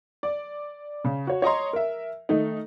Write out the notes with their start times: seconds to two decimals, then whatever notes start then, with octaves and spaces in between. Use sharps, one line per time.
0.23 D5
1.04 C#3
1.27 F#4 C#5
1.42 C#5 D#5 A#5 C6
1.73 A#4 E5
2.29 D#3 A3 D#4